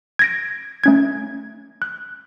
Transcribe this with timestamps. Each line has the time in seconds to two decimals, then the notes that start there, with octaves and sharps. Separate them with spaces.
0.19 G#6 A#6 D7
0.84 A3 C#4 G#6
1.82 F#6